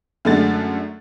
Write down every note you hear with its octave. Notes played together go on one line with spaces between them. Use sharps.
F#2 D3 G#3 A3 F#5 A6